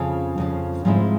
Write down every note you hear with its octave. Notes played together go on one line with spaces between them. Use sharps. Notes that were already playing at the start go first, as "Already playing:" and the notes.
Already playing: F2 C#3 F3
F2 C#3 F3
G#2 F3 G#3 C4 E4